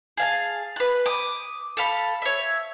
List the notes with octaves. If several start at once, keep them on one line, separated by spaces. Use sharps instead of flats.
G#4 F5 A5
B4 F#6
D6 D#6
A4 F5 B5
C#5 E5